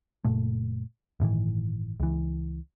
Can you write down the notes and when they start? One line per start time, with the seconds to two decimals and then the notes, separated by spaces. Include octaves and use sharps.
0.25 F#1 A#2 A3
1.20 G1 A2 D#3 E3
2.00 C#2 E3